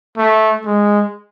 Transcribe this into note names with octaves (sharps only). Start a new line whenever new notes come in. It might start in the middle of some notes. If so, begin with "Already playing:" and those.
A3
G#3